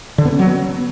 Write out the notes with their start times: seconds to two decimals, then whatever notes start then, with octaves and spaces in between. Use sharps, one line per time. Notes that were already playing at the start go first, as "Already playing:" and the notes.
0.18 D3
0.25 B3
0.32 C#4
0.39 F#3
0.46 B3